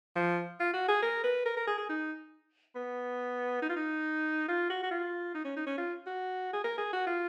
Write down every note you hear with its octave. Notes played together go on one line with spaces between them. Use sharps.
F3
F4
F#4
G#4
A#4
B4
A#4
A#4
G#4
G#4
D#4
B3
D#4
F4
D#4
F4
F#4
F#4
F4
D#4
C#4
D#4
C#4
F4
F#4
G#4
A#4
G#4
F#4
F4